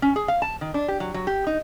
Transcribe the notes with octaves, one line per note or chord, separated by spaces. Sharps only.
C#4
G#4
F5
A5
D#3
D4
G4
F#3
F#3
G4
D#4